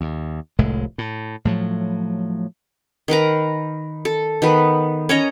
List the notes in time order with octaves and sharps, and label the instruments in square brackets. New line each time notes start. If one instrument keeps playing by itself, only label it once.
[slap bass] D#2
F1 C2 A2 G#3
A2
A2 F3 F#3
[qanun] D#3 A#4 B4 A#5
A4
D#3 B3 B4
C#4 C#5 D#5 A#5